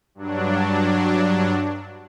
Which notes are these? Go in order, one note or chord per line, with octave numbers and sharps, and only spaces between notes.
G2 F#3 D4